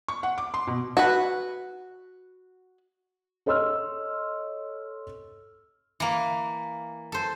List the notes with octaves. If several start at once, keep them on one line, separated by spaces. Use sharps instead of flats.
C#6
F#5
D6
C6
B2
F#4 B4
A4 C#5 D#5 C6 E6 F6
E3 A#3
A4 C5